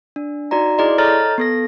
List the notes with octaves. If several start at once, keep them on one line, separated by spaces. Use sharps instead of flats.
D4
D#4 F#4 D5 A#5
E4 G#4 D5 D#5 C6
A4 C#5 D#5 A#5 F6 A6
B3 A4 A#6